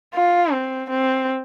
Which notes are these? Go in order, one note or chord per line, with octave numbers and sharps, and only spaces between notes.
F4
C4
C4